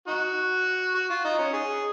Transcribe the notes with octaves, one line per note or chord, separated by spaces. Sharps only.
D#4 F#4
F#4
F4
D#4
C#4
G#4